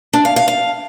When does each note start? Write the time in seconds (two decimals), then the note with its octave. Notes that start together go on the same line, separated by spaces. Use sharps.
0.13 D4
0.25 F5
0.36 F5
0.48 F5